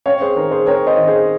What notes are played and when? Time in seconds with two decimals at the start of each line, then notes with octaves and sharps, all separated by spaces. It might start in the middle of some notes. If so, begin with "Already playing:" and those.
0.06 C4 C#5 F5
0.21 G#4 C5
0.36 D#3 A#4
0.51 G#4 C5
0.66 C4 A#4 C#5
0.86 C5 D#5
0.97 D#3
1.07 G#4 C5